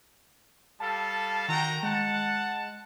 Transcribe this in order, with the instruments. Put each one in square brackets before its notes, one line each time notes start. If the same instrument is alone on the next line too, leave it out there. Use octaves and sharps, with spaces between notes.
[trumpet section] G3 A4 F5 [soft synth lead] A5
[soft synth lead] D#3 [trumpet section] F#4 G5 A#5
[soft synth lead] G#3 [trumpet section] F#5 A5